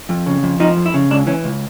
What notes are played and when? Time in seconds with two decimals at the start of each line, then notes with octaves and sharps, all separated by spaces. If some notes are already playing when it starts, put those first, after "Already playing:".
0.09 F2
0.26 C#3
0.43 F2
0.60 F3 D#4
0.77 F2
0.86 E4
0.94 C#3
1.11 C#2 D4
1.27 E3 C#4
1.44 C#2